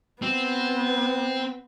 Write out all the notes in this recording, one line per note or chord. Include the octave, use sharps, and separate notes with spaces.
B3 C4